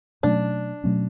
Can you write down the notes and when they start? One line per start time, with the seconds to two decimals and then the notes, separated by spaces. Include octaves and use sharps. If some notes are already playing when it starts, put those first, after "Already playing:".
0.23 B2 F#3 A3 C#4 D4
0.84 B2 F#3 A3 C#4